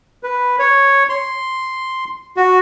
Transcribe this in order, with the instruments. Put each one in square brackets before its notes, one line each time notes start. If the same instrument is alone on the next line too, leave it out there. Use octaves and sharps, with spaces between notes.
[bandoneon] B4
C#5
C6
F#4